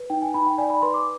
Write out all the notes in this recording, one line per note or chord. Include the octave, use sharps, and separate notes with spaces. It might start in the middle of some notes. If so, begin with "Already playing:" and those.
Already playing: B4
D#4 G5
G#5
D#4 B5
G5
D5 G#5
B5
B4 C6
D6